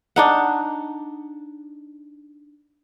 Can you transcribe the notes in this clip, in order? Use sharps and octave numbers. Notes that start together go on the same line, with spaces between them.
D4 D#4 F#5